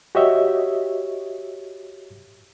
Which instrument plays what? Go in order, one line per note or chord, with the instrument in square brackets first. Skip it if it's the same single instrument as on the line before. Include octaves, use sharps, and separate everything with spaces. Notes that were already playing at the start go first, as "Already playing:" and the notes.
[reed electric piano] F#4 G4 C#5 D#5 E5